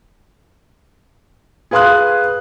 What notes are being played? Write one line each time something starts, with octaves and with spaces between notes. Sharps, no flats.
G#4 B4 F5 C6 D#6 F#6